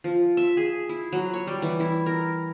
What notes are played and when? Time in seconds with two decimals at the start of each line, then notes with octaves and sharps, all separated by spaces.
0.04 F3
0.37 E5
0.57 G#4
0.89 E4
1.13 F#3
1.33 C#5
1.47 G3
1.62 E3
1.80 E4
2.06 A#4